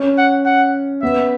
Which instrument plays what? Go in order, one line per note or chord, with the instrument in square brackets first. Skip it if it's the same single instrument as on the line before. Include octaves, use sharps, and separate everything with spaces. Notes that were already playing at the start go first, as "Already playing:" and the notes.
Already playing: [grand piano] C#4
[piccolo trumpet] F#5
F#5
[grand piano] B3 [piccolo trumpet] E5